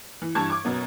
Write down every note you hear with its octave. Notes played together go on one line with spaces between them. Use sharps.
E3
G2 E3 A5 C#6 G#6
C#6 D6
F#2 B2 B3